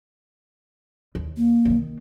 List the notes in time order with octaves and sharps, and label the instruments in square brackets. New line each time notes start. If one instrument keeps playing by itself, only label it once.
[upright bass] D#2
[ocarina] A#3
[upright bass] D3 D#3